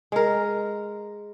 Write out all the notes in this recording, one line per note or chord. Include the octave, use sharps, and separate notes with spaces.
G#3 A#4